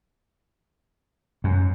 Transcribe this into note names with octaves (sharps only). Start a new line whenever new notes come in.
F#2